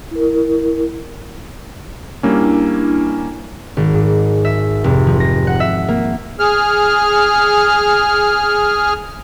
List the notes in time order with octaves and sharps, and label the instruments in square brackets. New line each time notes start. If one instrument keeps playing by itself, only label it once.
[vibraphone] E4 A#4
[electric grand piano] G3 A#3 C#4 [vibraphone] D4 E4
[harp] G#1
G#2
E5
F1
F3
A#6
F#5
E5
A#3
[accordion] G#4 F6